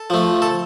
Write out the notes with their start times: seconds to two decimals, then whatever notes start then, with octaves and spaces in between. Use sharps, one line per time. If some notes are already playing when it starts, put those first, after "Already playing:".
Already playing: A4
0.10 F3 A3
0.42 A4